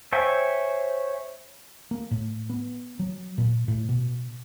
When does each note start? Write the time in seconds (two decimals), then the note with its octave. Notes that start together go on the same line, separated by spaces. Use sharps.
0.13 C5 C#5 E5 G5 G#5
1.91 A#3
2.11 A2
2.50 B3
2.99 F#3
3.38 A#2
3.68 A2
3.89 B2